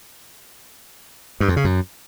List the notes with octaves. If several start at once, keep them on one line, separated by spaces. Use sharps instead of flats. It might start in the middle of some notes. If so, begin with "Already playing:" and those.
G2
F2
C#3
F#2